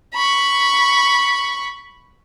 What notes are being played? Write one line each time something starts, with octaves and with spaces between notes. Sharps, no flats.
B5 C#6